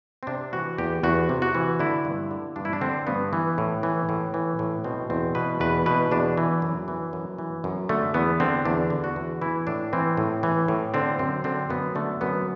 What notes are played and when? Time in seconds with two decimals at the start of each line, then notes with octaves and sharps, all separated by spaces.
0.23 C4
0.27 C3 D4
0.53 E3 F#4
0.78 E2 G4
1.03 E2 F#4
1.29 C3
1.42 F#4
1.55 E3
1.80 D3 E4
2.05 G2
2.31 D3
2.56 G2 D4
2.65 E4
2.73 D4
2.81 D3 C4
3.07 G2 B3
3.33 E3
3.58 A2
3.83 E3
4.09 A2
4.34 E3
4.59 A2
4.84 B2 C4
5.10 E2 C4
5.35 B2 B4
5.60 E2 B4
5.86 B2 B4
6.11 E2 D4
6.37 E3
6.62 F#2
6.88 E3
7.13 F#2
7.38 E3
7.64 F#2
7.89 D3 A3
8.14 E2 B3
8.40 D3 C4
8.65 E2 D4
8.90 D3
9.04 F#4
9.16 E2
9.42 E3 E4
9.67 A2 D4
9.93 E3 C4
10.17 A2
10.43 E3
10.68 A2
10.94 D3 C4
11.19 F#2 C4
11.44 D3 C4
11.70 F#2 B3
11.95 D3 A3
12.21 F#2 B3